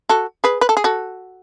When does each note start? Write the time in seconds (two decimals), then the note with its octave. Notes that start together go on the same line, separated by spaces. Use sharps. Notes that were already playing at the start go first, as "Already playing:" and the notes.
0.09 F#4 A4
0.44 G#4 B4
0.61 B4
0.69 A4
0.77 G#4
0.84 F#4 A4